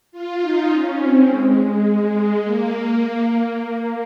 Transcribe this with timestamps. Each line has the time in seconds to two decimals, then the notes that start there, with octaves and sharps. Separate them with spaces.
0.12 F4
0.41 D#4
0.70 C#4
0.99 C4
1.27 G#3
1.56 G#3
2.42 A#3
3.00 A#3
3.29 A#3